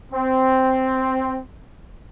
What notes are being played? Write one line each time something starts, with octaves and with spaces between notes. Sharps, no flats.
C4